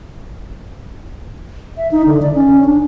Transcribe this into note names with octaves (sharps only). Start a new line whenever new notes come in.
E5
D#4
D3
D5
C#4
D4